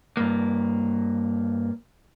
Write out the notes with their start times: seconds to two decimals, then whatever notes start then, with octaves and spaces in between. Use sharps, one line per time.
0.17 G2 A#3